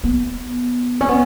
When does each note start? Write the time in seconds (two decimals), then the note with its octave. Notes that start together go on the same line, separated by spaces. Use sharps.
0.04 B3
1.01 C#4
1.09 B3